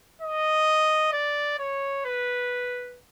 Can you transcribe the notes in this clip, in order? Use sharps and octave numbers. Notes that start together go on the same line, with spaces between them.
D#5
D5
C#5
B4